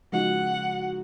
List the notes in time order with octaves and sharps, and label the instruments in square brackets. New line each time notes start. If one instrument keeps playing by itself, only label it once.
[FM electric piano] C#3 F3 G#3 D#4 F#4 [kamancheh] F#5